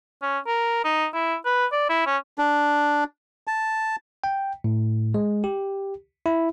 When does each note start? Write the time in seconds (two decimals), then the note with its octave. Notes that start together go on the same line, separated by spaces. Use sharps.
0.22 C#4
0.47 A#4
0.84 D#4
1.14 E4
1.45 B4
1.72 D5
1.89 E4
2.06 C#4
2.38 D4
3.47 A5
4.24 G5
4.64 A2
5.14 G#3
5.44 G4
6.26 E4